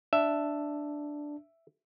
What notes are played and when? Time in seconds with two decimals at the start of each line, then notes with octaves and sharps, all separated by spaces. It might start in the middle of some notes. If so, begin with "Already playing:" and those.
0.13 D4 E5